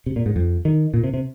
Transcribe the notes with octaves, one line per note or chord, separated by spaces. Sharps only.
C3
A#2
G#2
F2
D#3
A#2
C3
C3